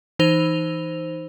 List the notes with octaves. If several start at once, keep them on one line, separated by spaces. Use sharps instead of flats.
E3 D#4 C5 F7